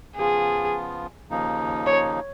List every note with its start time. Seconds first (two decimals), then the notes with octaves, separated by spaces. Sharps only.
0.16 C#3 F3 B3 F4 G#4
1.29 D#2 C#3 F3 A#3 D#4
1.86 C#5